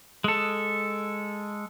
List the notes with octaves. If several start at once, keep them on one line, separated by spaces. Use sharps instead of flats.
G#3 A4